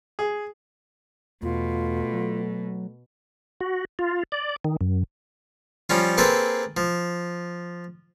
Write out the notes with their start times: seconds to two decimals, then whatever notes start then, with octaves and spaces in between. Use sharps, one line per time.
0.19 G#4
1.43 E2 B2 A3 F4
2.13 F#3
3.61 F#4
3.99 F4
4.32 D5
4.64 D#3
4.81 F#2
5.90 F3 G3 C#4 F4
6.18 A#3 C4 G#4 A4 B4 C5
6.77 F3